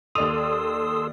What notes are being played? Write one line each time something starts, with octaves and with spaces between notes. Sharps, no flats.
D#2 A4 D5 C6 D#6 E6 F7